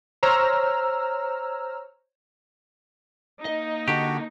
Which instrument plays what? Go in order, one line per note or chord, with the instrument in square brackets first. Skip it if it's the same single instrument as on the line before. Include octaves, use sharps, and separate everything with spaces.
[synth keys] C5 C#5 A#5 E6 F6
[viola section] A#3 D#4 [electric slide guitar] D#5
[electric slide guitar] D3 [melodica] F#4 [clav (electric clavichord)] G4